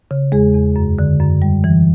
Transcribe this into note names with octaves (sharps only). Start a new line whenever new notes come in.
C#3
E2 G#3 G#4
E2
F#2
D3
F#2
G3
E3